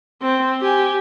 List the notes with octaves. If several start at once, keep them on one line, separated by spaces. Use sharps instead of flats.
C4
G4 G#5